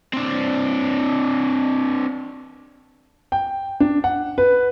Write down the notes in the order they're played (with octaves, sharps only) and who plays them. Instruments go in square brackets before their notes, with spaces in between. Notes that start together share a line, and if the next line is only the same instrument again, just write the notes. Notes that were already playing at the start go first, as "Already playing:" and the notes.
[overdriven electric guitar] C4 D4
[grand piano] G5
D4
F#5
B4